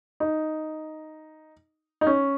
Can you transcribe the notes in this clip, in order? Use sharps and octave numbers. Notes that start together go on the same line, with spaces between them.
D#4
D#4
C#4